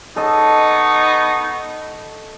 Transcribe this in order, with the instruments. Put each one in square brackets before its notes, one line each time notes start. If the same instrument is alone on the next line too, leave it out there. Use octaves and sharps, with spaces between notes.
[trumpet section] B3 D#4 C#6 [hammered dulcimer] A4 D#5